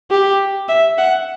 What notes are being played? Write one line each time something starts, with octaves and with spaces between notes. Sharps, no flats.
G4
E5
F#5